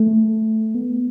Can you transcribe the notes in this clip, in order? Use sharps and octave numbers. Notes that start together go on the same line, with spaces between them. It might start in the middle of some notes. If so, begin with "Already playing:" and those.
Already playing: A3
B3